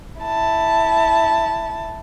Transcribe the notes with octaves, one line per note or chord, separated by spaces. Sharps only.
E4 A5